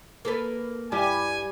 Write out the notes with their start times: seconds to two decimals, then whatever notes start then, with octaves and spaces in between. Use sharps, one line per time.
0.25 A#3 A4 B4
0.92 G2 G3 E4 G4 G#5